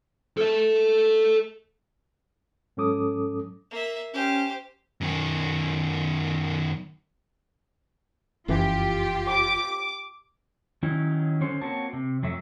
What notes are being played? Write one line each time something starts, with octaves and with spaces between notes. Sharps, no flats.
A4 E5
G#2 F#3 C#4 A4 D6 D#6
A#3 E5
C#4 G4 C5
F#2 D#3
F1 F#2 E3 F4 G4
D6
D#3 F#3 C#4 D#4 E4
D3 C#4 C5
A#3 C4 F#4 C#5 A5
C3
F2 F#3 A3 E5